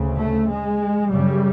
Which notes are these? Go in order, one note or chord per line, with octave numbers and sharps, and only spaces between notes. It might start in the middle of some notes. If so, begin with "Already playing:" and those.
Already playing: D2 C#3
A3
G#3
F#2 C#3 G3